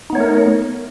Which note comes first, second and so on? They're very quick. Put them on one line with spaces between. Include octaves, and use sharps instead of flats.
D#4 B3 C#5 A3 A#4